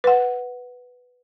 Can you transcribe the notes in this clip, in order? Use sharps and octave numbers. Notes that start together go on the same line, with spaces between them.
B4 F#5